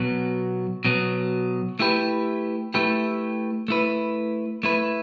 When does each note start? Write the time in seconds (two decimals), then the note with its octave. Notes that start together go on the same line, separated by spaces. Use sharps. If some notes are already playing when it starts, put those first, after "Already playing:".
Already playing: B2 F#3 B3
0.85 B2 F#3 B3
1.79 A3 E4 G4 B4
2.74 A3 E4 G4 B4
3.68 A3 E4 B4
4.63 A3 E4 B4